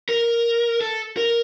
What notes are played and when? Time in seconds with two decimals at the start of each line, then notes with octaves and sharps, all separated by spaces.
0.09 A#4
0.81 A4
1.17 A#4